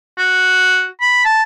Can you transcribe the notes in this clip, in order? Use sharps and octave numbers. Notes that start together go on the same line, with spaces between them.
F#4
B5
A5